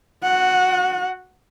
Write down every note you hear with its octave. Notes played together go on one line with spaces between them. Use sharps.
F#4 F#5